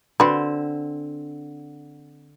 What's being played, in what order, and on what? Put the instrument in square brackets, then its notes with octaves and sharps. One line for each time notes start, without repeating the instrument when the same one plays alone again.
[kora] D3 C4 [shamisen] F#4 B4